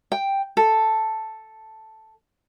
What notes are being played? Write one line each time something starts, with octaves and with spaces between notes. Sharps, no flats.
G5
A4